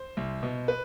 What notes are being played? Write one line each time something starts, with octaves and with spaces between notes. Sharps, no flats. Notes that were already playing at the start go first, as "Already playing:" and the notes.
Already playing: C5
C2
B2
B4